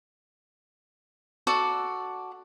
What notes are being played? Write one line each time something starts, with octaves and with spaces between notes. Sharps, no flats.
F#4 A4 D5